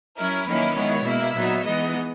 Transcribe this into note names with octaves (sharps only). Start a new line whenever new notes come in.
F#3 C#4 E4 A#4
D#3 F#3 A#3 C#4 E4 B4
D#3 G#3 B3 E4 C#5
B2 A#3 E4 E5
A#2 F#3 B3 D#4
E3 G#3 B3 D#4 D#5